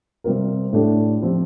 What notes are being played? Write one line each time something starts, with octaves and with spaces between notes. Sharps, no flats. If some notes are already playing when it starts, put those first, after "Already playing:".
C3 G3 C4 F4 A#4
A2 A3 D4 G4
F3 C4 G4